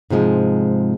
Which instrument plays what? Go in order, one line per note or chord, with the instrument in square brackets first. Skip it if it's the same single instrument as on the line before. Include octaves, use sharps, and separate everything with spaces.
[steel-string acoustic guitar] G#2 C3 F3 G#3